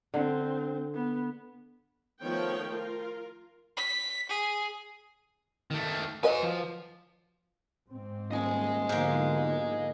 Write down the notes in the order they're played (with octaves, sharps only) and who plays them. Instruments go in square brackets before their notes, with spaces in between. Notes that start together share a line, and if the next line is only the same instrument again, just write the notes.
[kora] D3 [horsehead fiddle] C4
[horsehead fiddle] B3
[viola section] D#3 F3 A3 B3 C#5 G5
F4 A#4
[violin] B6
G#4
[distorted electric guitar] D#3 A3
[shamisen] F#3 B4 D#5 [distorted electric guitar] C5 G#5
[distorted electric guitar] F3
[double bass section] G#2 C4
[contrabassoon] D#1 [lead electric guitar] D#5 G#5
[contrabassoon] B1 [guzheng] G#2 A#3 [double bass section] D3 F3